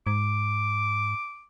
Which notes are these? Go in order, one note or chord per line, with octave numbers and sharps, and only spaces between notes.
G#2 D6